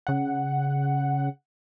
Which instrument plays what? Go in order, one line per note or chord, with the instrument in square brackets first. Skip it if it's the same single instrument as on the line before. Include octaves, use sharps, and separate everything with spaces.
[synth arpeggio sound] C#3 F#5